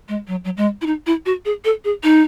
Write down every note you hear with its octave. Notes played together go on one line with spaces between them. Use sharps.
G#3
F#3
F#3
G#3
E4
D#4
E4
F#4
G#4
A4
G#4
D#4